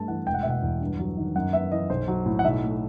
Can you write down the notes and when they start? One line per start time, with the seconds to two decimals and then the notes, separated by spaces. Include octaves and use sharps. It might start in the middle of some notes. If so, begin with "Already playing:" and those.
Already playing: G2 A3 A5
0.08 E3 F#5
0.27 E1 G5
0.34 F#5
0.43 B2 E5
0.50 F#5
0.62 E2
0.81 G2
0.99 F#3
1.17 D#3
1.36 F#2 F#5
1.53 B3 E5
1.71 E3 D#5
1.90 B1 C5
2.08 F#3
2.26 A2
2.39 F#5
2.44 B1 E5
2.62 A3